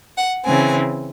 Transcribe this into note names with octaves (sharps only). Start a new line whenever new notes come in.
F#5
C#3 E3 C4 G#5